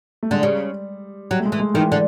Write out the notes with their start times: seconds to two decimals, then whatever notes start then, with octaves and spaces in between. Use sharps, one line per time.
0.23 A3
0.31 D3 G#3
0.43 C#3 G3
1.31 F#3 G3
1.40 A3
1.45 G#3
1.52 E3
1.60 G#3
1.74 D#3 E3
1.92 D3